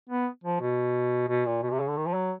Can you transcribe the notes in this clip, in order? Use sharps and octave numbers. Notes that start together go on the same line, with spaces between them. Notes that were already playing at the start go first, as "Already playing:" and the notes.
B3
F3
B2
B2
A#2
B2
C3
C#3
D3
D#3
F3
F#3